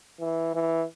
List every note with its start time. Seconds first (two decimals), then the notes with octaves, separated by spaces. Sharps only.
0.20 E3
0.54 E3